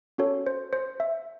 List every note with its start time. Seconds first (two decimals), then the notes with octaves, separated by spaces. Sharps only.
0.18 C#4 F#4 A4 C#5
0.46 C5
0.73 C5
1.00 E5